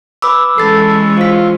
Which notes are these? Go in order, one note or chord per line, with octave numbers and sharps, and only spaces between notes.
B4 B5 D6 E6
E3 G#3 C#4 A4 B5 A6 C7
F4 C5 B6